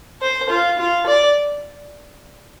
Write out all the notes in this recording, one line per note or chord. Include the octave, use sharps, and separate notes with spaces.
C5
F4
F4
D5